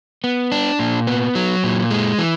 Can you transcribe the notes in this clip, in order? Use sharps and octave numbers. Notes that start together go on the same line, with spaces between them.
B3
D4
A#2
B3
F#3
A#2
G#3
E3